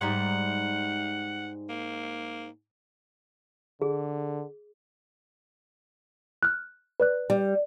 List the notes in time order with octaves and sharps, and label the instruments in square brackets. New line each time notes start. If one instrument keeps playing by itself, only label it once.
[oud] G#2 G3 D#4 [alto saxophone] F#5
[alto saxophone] A#3
[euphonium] D3 [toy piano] G#4
[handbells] F6 F#6
B4 D5 F#6
[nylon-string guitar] G3